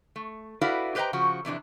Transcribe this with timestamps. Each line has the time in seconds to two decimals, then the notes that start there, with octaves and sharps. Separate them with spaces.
0.16 A3
0.61 E4 F#4 A4 B4 D5 F5
0.95 G4 B4 C5 D#5 G5 A#5
1.13 C#3 F3 F#4
1.45 F2 C3 E3 D4